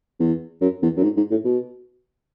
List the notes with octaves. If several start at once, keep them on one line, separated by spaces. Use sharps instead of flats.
E2
F#2
E2
F#2
G#2
G#2
A2
B2